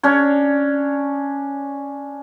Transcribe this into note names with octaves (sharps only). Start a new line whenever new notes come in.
C#4 D4 C#5